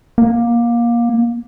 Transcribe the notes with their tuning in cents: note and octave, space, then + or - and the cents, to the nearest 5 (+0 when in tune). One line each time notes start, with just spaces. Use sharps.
A#3 +20